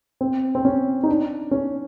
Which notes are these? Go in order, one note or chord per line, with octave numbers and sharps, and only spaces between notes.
C4
C4
C#4
D#4
D4
C#4